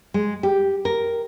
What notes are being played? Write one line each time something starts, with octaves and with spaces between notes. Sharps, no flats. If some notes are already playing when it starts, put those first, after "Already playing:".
G#3
G4
A#4